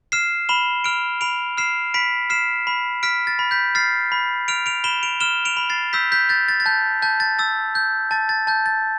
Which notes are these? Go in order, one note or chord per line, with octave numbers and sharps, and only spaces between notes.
F6 C7 E7
B5 E7 G7
F6 D7 F7
B5 D7 F7
F6 C7 E7
B5 B6 D7
F6 C7 E7
B5
F6 B6 D7
A6
B5
G6 B6
F6 A6 C7
B5
F6 D7 F7
D7 F7
B5 E7 G7
D7 F7
F6 E7 G7
D7 F7
B5
A6 C7
E6 G6 B6
G6 B6
G6 A6
A6
A6
A5 G6
A5 G6
A6
E6 A6
G6
A5 A6
A6
A5 G6
A6